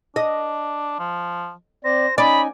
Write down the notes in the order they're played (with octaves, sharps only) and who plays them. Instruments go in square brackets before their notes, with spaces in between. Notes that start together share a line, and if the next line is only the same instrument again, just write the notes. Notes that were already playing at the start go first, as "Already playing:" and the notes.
[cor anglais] D4 [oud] D#5
[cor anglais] F3
[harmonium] C4 D5 [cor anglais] C5 [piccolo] A#6
[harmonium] C#4 D#4 G#5 [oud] D5 [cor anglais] D#5 [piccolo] B5